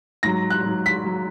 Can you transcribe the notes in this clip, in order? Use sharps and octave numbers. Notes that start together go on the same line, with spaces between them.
G#2 F#3 A#6
F#6
G#2 F#3
B6
F#3